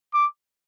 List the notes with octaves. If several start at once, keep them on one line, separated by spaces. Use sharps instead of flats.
D6